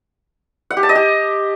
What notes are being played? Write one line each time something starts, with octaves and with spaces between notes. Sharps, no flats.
F#5
G4
A5
D#5
G4